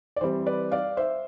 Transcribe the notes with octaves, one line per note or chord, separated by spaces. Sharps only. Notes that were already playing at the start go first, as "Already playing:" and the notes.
D5
E3 G3 C4 C5
B4 D5
D5 F5
C5 E5